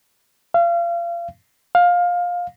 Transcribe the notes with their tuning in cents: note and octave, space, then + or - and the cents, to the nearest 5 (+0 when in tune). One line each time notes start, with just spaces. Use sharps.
F5 -35
F5 +15